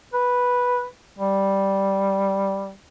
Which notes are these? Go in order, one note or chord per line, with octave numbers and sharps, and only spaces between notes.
B4
G3